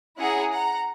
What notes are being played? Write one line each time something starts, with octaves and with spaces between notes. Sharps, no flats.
C#4 E4 G#4 F#5 A#5
F#5 A#5